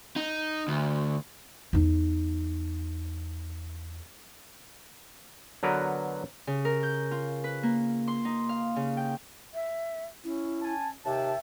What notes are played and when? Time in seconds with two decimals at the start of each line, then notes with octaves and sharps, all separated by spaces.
0.16 D#4
0.68 D2
1.73 E2 D#4
5.63 D3 F#3 B3 A#4 B4
6.47 C#3
6.65 A#4
6.83 G6
7.11 F4
7.44 B4
7.63 A#3
8.08 C6
8.25 D#4
8.49 F5
8.76 C#3
8.97 G5
9.54 E5
10.24 C#4 E4
10.62 G#5 A5
11.06 D#2 C3 E5 G5 A5